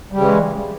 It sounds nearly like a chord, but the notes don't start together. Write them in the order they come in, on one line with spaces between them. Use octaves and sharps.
G3 C#3 E3 G#3